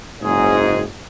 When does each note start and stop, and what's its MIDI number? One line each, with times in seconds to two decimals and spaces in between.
0.23 0.84 30
0.23 0.84 44
0.23 0.84 56
0.23 0.84 68